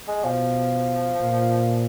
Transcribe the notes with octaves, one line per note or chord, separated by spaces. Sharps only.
G#3
B2 F3
A#2